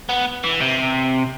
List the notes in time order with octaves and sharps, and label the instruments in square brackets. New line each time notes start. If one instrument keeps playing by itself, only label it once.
[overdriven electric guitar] B3
E3
C3